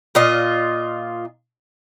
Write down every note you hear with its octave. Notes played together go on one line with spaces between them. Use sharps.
A#2 F4 D#5